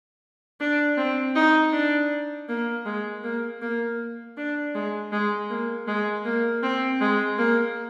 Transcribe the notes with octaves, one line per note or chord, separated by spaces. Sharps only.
D4
C4
D#4
D4
A#3
G#3
A#3
A#3
D4
G#3
G#3
A#3
G#3
A#3
C4
G#3
A#3